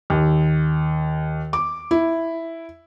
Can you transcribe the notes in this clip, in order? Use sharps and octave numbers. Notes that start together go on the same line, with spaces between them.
D#2
D6
E4